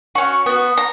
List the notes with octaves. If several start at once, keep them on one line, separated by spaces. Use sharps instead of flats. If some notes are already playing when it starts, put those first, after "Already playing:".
C#4 F#4 C#6
B3 F#4
A#5